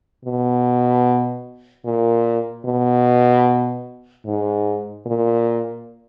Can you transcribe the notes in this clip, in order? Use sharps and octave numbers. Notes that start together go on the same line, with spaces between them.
B2
A#2
B2
G#2
A#2